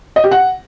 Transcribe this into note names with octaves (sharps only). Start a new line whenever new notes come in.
D#5
G4
F#5